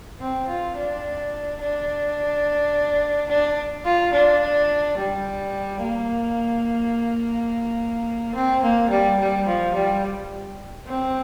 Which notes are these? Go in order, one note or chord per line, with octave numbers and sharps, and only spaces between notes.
C4
F4
D4
D4
D4
F4
D4
G3
A#3
C4
A#3
G3
G3
F3
G3
C4